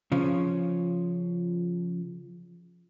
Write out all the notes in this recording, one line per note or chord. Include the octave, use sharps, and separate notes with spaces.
C#3 F3 C#4